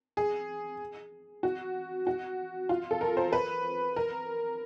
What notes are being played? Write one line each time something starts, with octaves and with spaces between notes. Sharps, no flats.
G#4
F#4
F#4
F4
A4
A#4
C5
B4
A#4